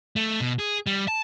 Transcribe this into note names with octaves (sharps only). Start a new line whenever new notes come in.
A3
B2
G#4
G3
A5